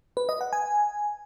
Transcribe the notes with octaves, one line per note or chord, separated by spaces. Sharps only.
B4
D#5
F#5
G#5